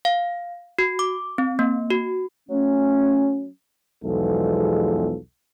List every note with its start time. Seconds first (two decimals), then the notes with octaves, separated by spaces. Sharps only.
0.05 F5
0.79 F#4
0.99 D6
1.38 C4
1.59 A#3
1.90 F#4
2.49 F#3 A3 C#4
4.04 B1 E2 F3 G#3 F4 A4